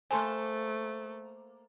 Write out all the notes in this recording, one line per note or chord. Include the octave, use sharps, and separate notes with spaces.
A3 A#3 A4 C5 G#5 A5 C6